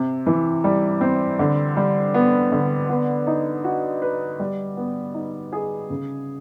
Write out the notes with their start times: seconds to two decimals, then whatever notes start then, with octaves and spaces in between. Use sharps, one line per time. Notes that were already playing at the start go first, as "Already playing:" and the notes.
Already playing: C3
0.27 E3
0.64 G3
1.01 C4
1.39 D3
1.77 G3
2.14 B3
2.52 D3
2.89 B3
3.27 D#4
3.64 F#4
4.02 B4
4.40 G3
4.77 B3
5.14 D#4
5.53 G#4
5.90 C#3